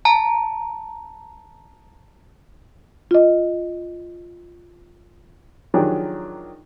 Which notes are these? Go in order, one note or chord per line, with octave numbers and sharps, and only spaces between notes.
A5 A#5
F4 D#5
D#3 F3 F#3 D4 G4 G#4